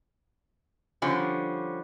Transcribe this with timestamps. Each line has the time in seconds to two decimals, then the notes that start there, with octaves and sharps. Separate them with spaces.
1.02 D3 F3 G3 C#4